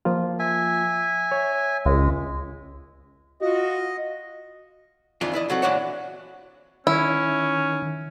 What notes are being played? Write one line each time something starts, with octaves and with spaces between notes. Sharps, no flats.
F3 A#3 F4
E5 G#5
C#5
C#2 G#3
F4 F#4 D#5
F2 D#3 E3 D4 F4
E4 D5 D#5
F#3 C4 F#4 A4
A#2 E3 D4 F#4 C#5 F#5
D#3 C#4 E4